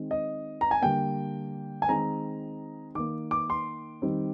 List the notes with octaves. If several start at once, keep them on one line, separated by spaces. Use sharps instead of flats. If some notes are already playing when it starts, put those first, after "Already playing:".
Already playing: D#3 G#3 C4
D#5
A#5
G#5
D3 G3 A#3 G5
G#5
D#3 G#3 C4 A#5
D#3 A#3 D6
D6
C6
D#3 G3 C4